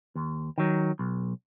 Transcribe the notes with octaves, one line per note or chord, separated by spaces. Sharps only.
D#2
D#3 F#3
B1